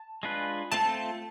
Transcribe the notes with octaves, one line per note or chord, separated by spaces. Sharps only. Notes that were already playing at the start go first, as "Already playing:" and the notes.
Already playing: A5
G#3 D4 F4 B4
A3 C4 F4 A4 A5